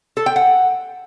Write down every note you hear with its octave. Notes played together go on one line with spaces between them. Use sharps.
A4
G5
F#5